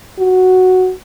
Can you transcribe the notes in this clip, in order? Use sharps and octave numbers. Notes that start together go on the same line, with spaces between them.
F#4